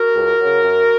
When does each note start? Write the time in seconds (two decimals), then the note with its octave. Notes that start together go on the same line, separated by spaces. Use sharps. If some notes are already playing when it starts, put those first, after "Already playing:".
Already playing: F#4 A#4
0.14 C#2
0.39 C#3 F#3
0.64 F#2